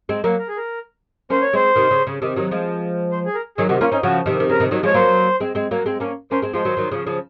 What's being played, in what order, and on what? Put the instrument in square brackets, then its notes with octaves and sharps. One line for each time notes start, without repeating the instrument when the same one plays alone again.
[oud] G#3 C4
F#3 A#3
[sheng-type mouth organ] A#4
G#4
A#4
[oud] A#3 C#4 [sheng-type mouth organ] C5
[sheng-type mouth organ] C#5
[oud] G#3 C4 [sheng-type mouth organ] C5
[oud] C3 D#3
C#3
C#3
C3 D#3
D#3 F#3
F3 G#3
[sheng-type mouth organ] C5
G#4
A#4
[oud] D#3 F#3 [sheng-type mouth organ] G#4
[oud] C3 D#3 [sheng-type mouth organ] F#4
[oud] A#3 C#4 [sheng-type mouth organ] F4
[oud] C4 D#4 [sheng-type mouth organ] C#4
[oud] C#3 F3 [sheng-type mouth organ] F#4
[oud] C3 D#3
D#3
[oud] C#3 [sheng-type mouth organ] A#4
[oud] C3 D#3
D#3 F#3
[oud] F3 G#3 [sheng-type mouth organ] C#5
[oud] F#3 A#3 [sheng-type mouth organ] C5
[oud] G#3 C4
G#3 C4
F#3 A#3
G#3 C4
A#3 C#4
[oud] A#3 C#4 [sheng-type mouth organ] C5
[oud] G#3 C4
[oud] F3 G#3 [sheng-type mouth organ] C5
[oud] D#3 F#3
D#3 F#3
C#3 F3
C#3 F3